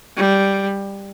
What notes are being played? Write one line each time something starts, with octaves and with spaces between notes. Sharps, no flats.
G3